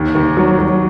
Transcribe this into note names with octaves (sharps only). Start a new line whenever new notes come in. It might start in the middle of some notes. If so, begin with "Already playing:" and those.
Already playing: D#2
D#2
F#3
F#3